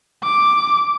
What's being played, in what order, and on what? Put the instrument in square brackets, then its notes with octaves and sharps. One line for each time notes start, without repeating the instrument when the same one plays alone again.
[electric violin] D6